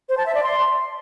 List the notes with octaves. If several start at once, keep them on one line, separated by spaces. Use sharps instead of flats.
C5
A5
E5
D5
C6